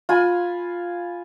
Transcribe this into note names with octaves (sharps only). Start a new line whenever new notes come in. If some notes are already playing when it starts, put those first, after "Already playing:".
F4 G#5 B5